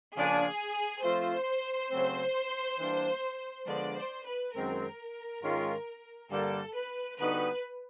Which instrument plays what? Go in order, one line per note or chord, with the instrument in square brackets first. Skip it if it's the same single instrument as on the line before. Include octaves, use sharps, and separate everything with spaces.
[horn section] C#3 F3 A#3 D4 [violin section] G#4
[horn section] F3 A3 C4 F4 [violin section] C5
[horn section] C#3 F#3 A3 C4
E3 G3 A#3 D4
[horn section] D3 F3 G#3 B3 D4 [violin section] D5
[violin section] C5
B4
[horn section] F#2 D#3 G#3 C4 [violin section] A#4
[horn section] G#2 D#3 G#3 C#4 F4
[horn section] G2 D3 G3 A#3 [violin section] A4
[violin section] B4
[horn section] D3 G3 B3 D#4 F#4 [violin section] B4